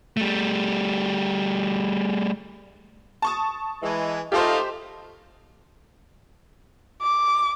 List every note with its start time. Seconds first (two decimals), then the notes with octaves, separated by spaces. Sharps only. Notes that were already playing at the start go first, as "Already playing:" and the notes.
0.17 G3 A3
3.22 A5 C#6 D#6
3.83 E3 G#3
4.32 A3 D#4 F4 G4 C5
7.02 D6